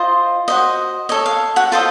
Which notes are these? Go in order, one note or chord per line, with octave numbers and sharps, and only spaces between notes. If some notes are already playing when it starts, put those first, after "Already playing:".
Already playing: F4 C5 D#5
F#4 C5 D#5
A4 C#5 D#5
F5
F#4 F#5
F4 A4 C5 D#5 A5